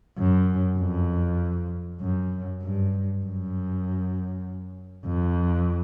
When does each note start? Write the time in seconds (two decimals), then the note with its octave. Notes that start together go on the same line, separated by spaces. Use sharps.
0.18 F#2
0.79 F2
2.01 F#2
2.62 G2
3.23 F#2
5.06 F2